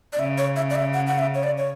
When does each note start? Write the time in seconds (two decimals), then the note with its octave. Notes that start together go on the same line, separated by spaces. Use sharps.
0.13 D5
0.19 C#3 E5
0.38 C#5
0.56 E5
0.70 D5
0.75 E5
0.94 F#5
1.07 F#5
1.19 E5
1.35 C#5
1.43 D5
1.58 C#5